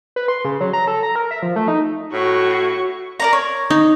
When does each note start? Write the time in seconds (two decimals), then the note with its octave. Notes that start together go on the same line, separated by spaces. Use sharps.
0.16 B4
0.28 C6
0.45 C#3
0.61 F#3
0.73 A#5
0.87 A4
1.03 A#5
1.16 A#4
1.31 E5
1.43 F3
1.56 A3
1.68 D#4
2.13 A2 F#4 C#6
3.20 A#4 D5 A#5
3.33 C#5
3.70 D#4